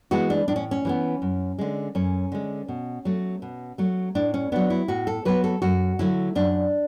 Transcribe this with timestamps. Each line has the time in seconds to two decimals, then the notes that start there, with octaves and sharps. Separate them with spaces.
0.11 E3 G#3 B3 F#4
0.30 D4
0.48 A2 D4
0.56 C#4
0.71 C#4
0.85 E3 G#3 B3
1.22 F#2
1.59 D3 G#3
1.95 F#2 C#4
2.32 D3 G#3
2.68 B2
3.05 F#3 A3
3.42 B2
3.78 F#3 A3
4.15 A2 D4
4.34 C#4
4.52 F#3 B3 D4
4.70 E4
4.88 A2 F#4
5.07 A4
5.25 F#3 B3 B4
5.44 A4
5.62 F#2 F#4
5.99 D3 F#3 A3 E4
6.35 F#2 D4